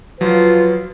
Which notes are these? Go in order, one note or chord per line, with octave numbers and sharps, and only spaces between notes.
F3 F#3 F4 B4